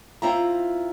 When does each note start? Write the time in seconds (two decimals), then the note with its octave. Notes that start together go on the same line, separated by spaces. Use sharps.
0.22 C4 E4 F4 A#5